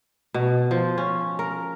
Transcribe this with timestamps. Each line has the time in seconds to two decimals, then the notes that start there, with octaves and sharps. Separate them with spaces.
0.34 B2
0.71 F3
0.98 C#4
1.39 A#4